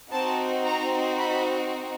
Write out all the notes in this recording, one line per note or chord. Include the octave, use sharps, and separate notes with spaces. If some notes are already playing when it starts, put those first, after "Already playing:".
C4 D#4 F#4 A5
A#5
B5